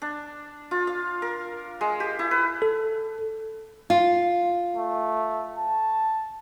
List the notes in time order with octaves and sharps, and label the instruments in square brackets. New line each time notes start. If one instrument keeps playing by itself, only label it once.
[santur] D4
F4
F5
A#4
G#3
G4
E4
B4
[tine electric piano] A4
[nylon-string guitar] F4
[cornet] A3
A5